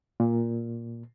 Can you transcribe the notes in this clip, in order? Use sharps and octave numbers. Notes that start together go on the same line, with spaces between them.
A#2